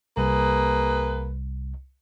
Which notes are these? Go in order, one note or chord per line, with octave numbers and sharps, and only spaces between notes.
C2 A#3 G#4 B4